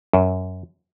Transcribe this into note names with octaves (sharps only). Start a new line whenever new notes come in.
F#2